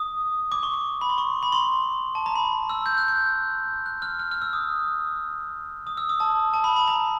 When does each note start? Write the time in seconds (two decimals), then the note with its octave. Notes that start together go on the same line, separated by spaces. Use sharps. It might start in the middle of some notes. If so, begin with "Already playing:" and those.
Already playing: D#6
0.52 D6
0.63 C#6
0.74 D6
1.01 B5
1.09 C6
1.18 C#6
1.43 B5
1.52 C6
2.15 A5
2.26 A#5
2.35 B5
2.70 E6
2.86 G6
2.98 F#6
3.08 G6
3.86 F#6
4.02 F6
4.19 F6
4.31 F6
4.42 E6
4.53 D#6
5.87 D#6
5.97 E6
6.09 D#6
6.20 A5
6.54 A5
6.64 B5
6.76 B5
6.88 A#5